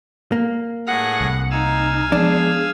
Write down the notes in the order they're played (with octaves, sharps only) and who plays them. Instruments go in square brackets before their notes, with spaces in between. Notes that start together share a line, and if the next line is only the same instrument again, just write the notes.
[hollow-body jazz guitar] A#3
[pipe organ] A2 G#4 A#6 [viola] F#5
[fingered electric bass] C2
[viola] D#4 [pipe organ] F5 G#5 E6
[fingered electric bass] F3 G#3 B3 [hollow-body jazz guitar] D4 [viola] G#4